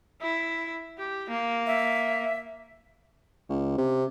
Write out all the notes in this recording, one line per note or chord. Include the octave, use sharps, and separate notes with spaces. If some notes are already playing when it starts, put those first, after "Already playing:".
E4
G4
A#3
E5
C#2
C3